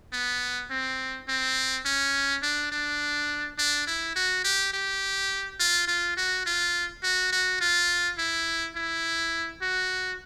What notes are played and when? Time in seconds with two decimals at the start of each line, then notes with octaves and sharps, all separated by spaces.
0.13 B3
0.70 C4
1.28 C4
1.85 C#4
2.43 D4
2.72 D4
3.59 D4
3.87 E4
4.16 F#4
4.44 G4
4.73 G4
5.59 F4
5.88 F4
6.17 F#4
6.46 F4
7.03 F#4
7.32 F#4
7.61 F4
8.18 E4
8.76 E4
9.62 F#4